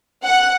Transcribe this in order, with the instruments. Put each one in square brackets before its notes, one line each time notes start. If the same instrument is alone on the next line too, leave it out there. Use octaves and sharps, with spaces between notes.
[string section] F#5